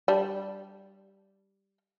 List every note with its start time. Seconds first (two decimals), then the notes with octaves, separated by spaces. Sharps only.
0.08 G3 D4